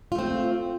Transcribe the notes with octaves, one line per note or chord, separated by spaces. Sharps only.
A3 C4 F4